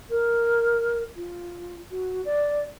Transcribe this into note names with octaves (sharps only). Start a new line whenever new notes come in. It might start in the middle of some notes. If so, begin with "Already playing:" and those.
A#4
F4
F#4
D5